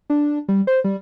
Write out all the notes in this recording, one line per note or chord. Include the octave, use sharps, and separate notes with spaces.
D4
G3
C5
G3